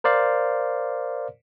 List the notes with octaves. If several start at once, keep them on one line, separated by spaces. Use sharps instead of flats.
A#4 C5 D5 F5